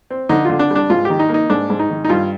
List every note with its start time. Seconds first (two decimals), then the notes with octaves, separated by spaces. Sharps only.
0.11 C4
0.29 D3 D#4
0.45 D3 F4
0.59 D4
0.70 G3 D4
0.90 G#2 F4
1.05 D#3 G4
1.19 D#4
1.29 A#3
1.34 D#4
1.50 G#2 D4
1.70 G#2
1.79 D#4
1.90 D#3
2.05 D#4
2.09 G2 F4